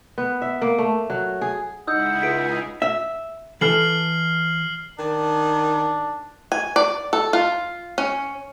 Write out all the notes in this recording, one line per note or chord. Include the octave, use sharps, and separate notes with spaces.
B3
E5
A#3
A3
F#3
G#4
C#3 G#3 D#4 E4 F#5 D#6 E6 G6
C#2 D#4 G#4 B6 D7
E5
E3 A4 F6 C7 F#7
D#3 D4
G#5
D5
A4
F4
C#4